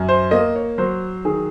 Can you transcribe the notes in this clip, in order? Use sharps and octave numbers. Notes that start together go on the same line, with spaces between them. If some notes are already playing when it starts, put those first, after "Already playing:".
Already playing: F#2
C5
A#3 D#5
C#5
F#3 C5
D#3 G#4